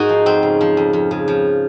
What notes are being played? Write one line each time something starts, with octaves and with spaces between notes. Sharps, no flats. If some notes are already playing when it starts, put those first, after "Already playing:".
Already playing: G#2 D#4 F#4 G#4 A#4
F3
F2 C4
C#3
F3
F2
F2
C#3
F3